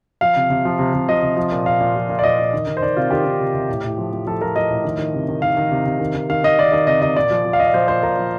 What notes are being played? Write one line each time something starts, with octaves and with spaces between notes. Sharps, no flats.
F3 F5
C3
C3
F3
C3
C3
F3 D#5
C3
F3
A#2
A#2 F5
A#2
F3
A#2
D5
F3 D#5
A#2
D#3
D#3
C5
D#3 D5
C3 F4
D#3 G4
D#3
C3
C3
A2
A2
F3
F3
F3 A4
F3 A#4
F3 D#5
A2
D#3
D#3
C3
D#3
D#3 F5
D#3
C3
C3
D#3
D#3
D#3 F5
D#3 D#5
D#3 D5
D#3 D#5
C3 D#5
C3 D#5
A#2 D5
F3
F3
F5
A#2 D#5
D5
F3 C5
A#2 C5
A#2 A#4
F3